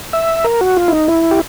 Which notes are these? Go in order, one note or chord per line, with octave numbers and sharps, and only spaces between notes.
E5
A#4
F#4
F4
E4
D#4
E4
G4